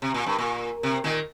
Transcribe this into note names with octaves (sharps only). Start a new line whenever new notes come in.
C3
A#2
G2
A#2
C3
A#2 D#3